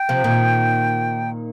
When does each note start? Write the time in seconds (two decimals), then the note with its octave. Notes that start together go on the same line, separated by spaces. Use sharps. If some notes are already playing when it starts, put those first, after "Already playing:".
Already playing: G5
0.09 C3 F3
0.24 A#2 D#3